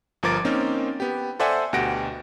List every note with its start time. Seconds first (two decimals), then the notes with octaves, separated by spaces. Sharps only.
0.23 G1 F3 A#4 D6 A6 D7
0.45 A#3 C4 C#4 D#4
1.00 B3 G4
1.39 A4 C5 D5 E5 F#5 G#5
1.73 D2 B2 G4 F#5 A#6 D7